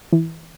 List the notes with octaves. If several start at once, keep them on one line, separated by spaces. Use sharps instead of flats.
E3